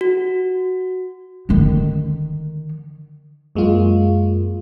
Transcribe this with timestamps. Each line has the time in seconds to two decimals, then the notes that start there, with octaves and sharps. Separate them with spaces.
0.01 F#4
1.49 D3 D#3
3.55 F#2 G#3 A#3 F4